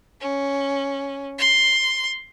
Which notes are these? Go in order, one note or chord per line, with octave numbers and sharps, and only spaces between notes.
C#4
C6